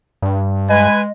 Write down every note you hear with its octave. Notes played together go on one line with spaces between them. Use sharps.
G2
G#3 B4 D#5 G#5